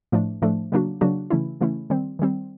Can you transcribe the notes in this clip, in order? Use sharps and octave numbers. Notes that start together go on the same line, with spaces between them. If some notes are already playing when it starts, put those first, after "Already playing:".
A2 F3 A3 D4
A2 F3 A3 D4
C#3 F#3 A#3 D4 F#4
C#3 F#3 A#3 D4 F#4
C#3 E3 A3 C#4 E4
C#3 E3 A3 C#4 E4
D#3 G3 C4
D#3 G3 C4